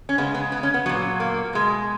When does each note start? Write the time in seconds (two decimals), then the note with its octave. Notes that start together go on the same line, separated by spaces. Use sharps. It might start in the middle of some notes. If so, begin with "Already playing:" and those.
0.09 C#4
0.18 C#3 G#3 B3
0.34 B3
0.52 B3
0.63 C#4
0.74 B3
0.86 A#2 F#3 B3
1.20 A#3
1.53 B2 G#3